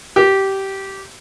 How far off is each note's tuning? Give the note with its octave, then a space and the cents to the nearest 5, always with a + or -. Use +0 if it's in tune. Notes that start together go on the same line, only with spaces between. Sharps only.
G4 -15